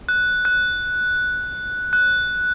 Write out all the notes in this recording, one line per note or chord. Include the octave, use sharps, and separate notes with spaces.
F#6
F#6
F#6